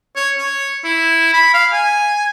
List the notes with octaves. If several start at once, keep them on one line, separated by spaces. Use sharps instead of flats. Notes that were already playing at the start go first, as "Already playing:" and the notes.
C#5
C#5
E4
B5
F5
G#5